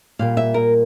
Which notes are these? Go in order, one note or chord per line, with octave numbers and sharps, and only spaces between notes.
A#2 G3 A#3 F5
E5
A#4